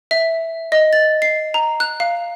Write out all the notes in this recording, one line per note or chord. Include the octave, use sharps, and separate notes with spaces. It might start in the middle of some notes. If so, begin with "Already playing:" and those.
E5
D#5
A6
C7
A#5
F#6
F5